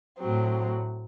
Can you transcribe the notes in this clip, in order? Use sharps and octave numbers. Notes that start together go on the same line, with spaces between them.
A2 F#3 C4